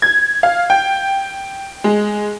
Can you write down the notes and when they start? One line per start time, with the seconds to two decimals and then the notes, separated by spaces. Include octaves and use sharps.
0.02 G#6
0.43 F5
0.70 G5
1.84 G#3